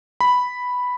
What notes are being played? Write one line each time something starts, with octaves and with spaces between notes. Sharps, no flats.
B5